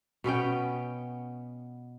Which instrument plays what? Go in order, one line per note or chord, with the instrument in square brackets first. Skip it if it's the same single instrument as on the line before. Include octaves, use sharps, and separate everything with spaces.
[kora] B2 B3 C#4 G5